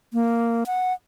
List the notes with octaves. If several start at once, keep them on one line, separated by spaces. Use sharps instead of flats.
A#3
F#5